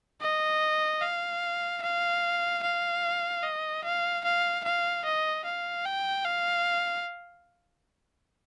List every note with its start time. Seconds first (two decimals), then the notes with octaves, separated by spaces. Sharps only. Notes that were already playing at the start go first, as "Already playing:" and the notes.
0.21 D#5
1.01 F5
1.82 F5
2.63 F5
3.43 D#5
3.83 F5
4.24 F5
4.64 F5
5.05 D#5
5.45 F5
5.85 G5
6.25 F5